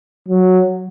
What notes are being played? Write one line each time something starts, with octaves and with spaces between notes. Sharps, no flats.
F#3